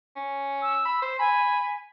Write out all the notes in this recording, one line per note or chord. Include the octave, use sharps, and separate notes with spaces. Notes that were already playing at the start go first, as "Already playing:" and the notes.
C#4
E6
B5
C5
G#5 B5